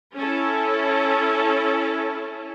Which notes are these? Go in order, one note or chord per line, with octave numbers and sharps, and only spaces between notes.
C#4 E4 A4